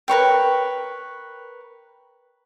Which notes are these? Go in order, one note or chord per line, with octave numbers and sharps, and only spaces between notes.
A#4 B4 C#5 G5